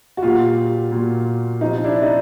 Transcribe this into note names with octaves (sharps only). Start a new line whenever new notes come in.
F#4
A#2 F#3 F4 G4
A#2 F#3
C3 F3 D#4
D4 E4
D#4